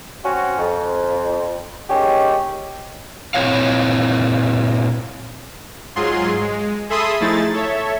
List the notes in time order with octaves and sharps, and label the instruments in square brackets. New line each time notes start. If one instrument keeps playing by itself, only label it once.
[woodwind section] C4 C#4 F#4
F2
D#3 G#3 C#4 G4
[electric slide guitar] A#2 C4 E4 C#5 F5
[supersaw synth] G#2 F#3 F4 G#4 C6
G#3
G#4 A4 E5 B5 C6 D#6
F3 A3 D#4 E4 G#4 A6
A4 C#5 E5